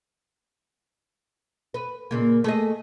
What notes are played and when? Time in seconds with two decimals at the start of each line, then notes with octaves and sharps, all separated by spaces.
1.74 B4
2.11 A#2 C#3 A#3
2.44 A3 G#4 D#5